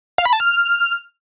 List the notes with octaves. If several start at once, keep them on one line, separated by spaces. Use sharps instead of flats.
F5
B5
A5
F6